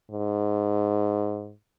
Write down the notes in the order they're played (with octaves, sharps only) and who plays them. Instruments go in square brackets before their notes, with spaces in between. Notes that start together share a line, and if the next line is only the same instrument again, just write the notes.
[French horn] G#2